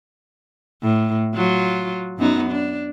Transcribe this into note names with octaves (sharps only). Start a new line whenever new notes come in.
A2
F#3 F4
F#2 B3 D#4
D4